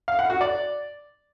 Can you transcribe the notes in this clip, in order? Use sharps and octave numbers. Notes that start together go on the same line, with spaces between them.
F5
F#5
F#4
D5